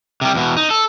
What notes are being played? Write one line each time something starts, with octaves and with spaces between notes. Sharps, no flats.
C3 G3
E2 B2
D#4
A4